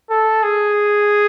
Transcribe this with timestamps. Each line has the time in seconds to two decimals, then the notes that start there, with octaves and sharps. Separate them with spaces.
0.10 A4
0.43 G#4